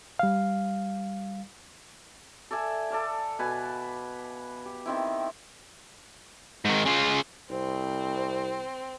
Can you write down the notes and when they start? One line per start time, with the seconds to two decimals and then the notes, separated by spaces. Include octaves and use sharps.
0.19 G3 F5
2.51 A4 D5 E5 G#5
2.90 A4 D5 F5 A5
3.39 B2 B4 G#5 A5
4.65 G4
4.86 D#3 C4 E4
6.65 G#2 D#3
6.85 C#3 F4
7.50 C2 C4